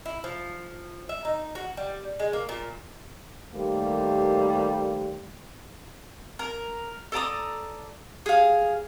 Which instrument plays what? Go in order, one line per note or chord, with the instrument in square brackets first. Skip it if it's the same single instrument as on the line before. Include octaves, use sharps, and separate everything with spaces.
[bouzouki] E4
F3
E5
D#4
F#4
G3
G#3
A#3
A#2
[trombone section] D#2 G3 A3 A#3 C5
[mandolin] A#4
A4 D5 A#5 D#6
G#4 F5